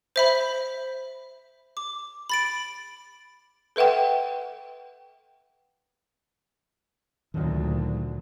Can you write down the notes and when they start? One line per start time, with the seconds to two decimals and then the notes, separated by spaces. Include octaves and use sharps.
0.16 C5 E5 B5
1.77 D6
2.30 B5 A6 D7
3.76 A4 B4 E5 F#5 G5
7.34 D2 A#2 D#3 F#3